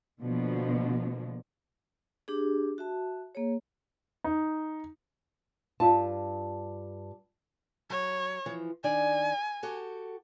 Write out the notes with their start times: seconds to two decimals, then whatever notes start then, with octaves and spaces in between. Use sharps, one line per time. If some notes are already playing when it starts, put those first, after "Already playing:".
0.23 B2 D3 F3 A#3
2.28 D4 G4 G#4
2.78 F#4 E5 A5
3.35 A#3 G#4 C#5
4.24 D#4
5.80 G2 F4 A5
7.90 F#3 C#5
8.46 E3 F3
8.84 D#3 D4 D5 G#5
9.63 F#4 G4 A4